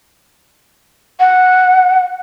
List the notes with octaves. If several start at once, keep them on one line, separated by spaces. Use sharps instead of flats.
F#5